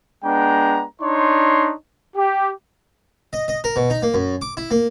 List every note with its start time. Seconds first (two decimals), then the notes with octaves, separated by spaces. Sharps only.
0.23 G#3 B3 D4 G5 A#5
1.01 D4 D#4 C#5 C6
2.16 G4
3.33 D#5
3.48 D#5
3.64 A#4
3.76 B2
3.90 D#4
4.02 A#3
4.14 F#2
4.42 D6
4.57 E4
4.71 A#3